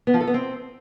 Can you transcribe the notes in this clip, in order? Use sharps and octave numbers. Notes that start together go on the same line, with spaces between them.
B3
F3
A4
B3
C4